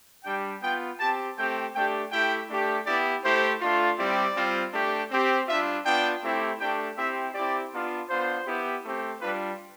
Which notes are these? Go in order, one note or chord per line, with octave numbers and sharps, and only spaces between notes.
G3 D4 G4 G5
B3 F4 G5
C4 G4 A5
A3 C4 G4 G5
A3 D4 G4 G5
A3 E4 G4 G5
A3 D4 G4
B3 E4 G4 D5
A3 E4 G4 C5
A3 D4 F4
G3 C4 E4 G4 D5
G3 C4 F4
A3 D4 G4
C4 G4
G3 D4 F4 E5
B3 D4 F4 G5
A3 C4 E4 G4
A3 D4 G4 G5
C4 E4 G4 E5
C4 E4 G4 D5
B3 D4 F4
B3 D4 F4 C5
B3 E4 G4
A3 C4 G4
G3 D4 F4 B4